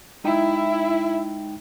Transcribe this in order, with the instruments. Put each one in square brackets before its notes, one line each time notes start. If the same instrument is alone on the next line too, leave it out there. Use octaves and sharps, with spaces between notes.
[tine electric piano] G#3 D#4 G5 [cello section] E4